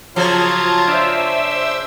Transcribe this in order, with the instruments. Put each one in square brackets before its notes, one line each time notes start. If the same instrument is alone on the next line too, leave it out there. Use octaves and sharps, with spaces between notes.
[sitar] C#3 F3 [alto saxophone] F#3 [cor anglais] F4 [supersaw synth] A5 A#5 G#6
[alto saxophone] D4 [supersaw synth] C5 E5 E6